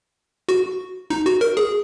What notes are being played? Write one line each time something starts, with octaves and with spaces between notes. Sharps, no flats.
F#4
D#4
F#4
A#4
G#4